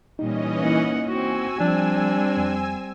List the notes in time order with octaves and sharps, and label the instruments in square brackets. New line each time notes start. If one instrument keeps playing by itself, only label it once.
[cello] A#2 G3 [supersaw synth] E3 C#4 D#5 [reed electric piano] D#4
[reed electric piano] A#3 D#4 E4 [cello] F#5
[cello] C4 F#4 [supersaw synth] G#5 E6
[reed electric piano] F3 [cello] G3 C4 [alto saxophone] D4
[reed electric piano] F2